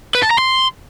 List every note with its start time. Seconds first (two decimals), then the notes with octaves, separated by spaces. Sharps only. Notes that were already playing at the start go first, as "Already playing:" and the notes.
0.15 B4
0.23 A5
0.31 A#5
0.38 C6